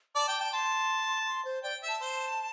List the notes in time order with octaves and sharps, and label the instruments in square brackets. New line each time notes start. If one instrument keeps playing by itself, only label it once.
[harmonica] D5 [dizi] A5
[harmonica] G5
G5
[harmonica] A5 [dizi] C6
[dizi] C6
C5
[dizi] D5 [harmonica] G5
[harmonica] E5
[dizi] A5
[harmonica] C5